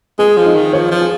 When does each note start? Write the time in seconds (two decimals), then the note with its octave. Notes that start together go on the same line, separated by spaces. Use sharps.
0.19 G#3 G#4
0.37 F3
0.46 D#4
0.55 D#3
0.73 F3 C#5
0.91 F3
1.01 G#4